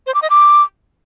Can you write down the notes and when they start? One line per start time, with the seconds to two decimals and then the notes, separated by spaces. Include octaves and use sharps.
0.07 C5
0.14 D6
0.22 D#5
0.30 D6